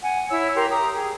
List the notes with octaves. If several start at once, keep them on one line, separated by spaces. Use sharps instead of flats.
F#5 G#5
E4 C#5 E6
G4 A#4 C6
G4 A#5 D#6
G#4